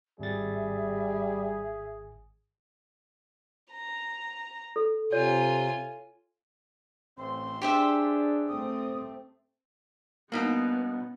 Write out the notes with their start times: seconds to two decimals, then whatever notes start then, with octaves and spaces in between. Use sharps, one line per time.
0.20 G#1 G3 G#4 E5 A6
3.72 A#5
4.76 A4
5.12 C3 F4 C#5 G#5
7.18 A1 C4 C6
7.62 D4 G4 G#4 C5 E5
8.48 A3 C4 D#6
10.32 G2 B2 A#3 B3 C#4 D#4